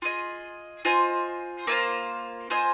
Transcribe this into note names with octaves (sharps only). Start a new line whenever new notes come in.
F4 G#4 D#5
F4 C5 D#5 G#5
A#3 F4 C5
F4 C5 D#5 G#5